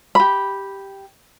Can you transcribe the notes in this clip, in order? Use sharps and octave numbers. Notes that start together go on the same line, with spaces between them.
G4 B5